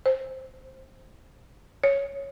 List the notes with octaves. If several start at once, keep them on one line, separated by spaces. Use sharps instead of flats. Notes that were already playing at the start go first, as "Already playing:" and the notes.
C5
C#5